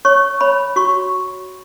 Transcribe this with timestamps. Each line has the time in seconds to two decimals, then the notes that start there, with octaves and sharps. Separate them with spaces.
0.05 C#5 C#6
0.41 C#5 B5
0.76 F#4 C#6